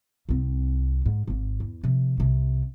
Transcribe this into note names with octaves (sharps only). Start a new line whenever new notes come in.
C2 C4
G#2
G#1 G#2
E2
C3 F3
C2 C3